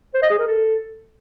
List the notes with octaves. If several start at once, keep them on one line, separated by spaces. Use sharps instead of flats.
C5
D#5
G#4
A#4
A4